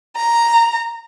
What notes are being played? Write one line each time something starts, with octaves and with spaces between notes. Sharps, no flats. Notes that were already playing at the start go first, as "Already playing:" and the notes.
A#5